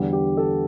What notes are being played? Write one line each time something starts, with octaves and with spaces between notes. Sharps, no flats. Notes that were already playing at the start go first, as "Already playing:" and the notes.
Already playing: E2 D3 G3
G4
A4